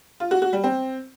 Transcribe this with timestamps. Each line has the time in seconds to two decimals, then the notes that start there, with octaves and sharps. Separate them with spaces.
0.20 F4
0.31 F#4
0.42 F#4
0.53 G3
0.64 C4